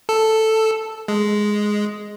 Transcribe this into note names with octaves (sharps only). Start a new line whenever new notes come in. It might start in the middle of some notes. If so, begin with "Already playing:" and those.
A4
G#3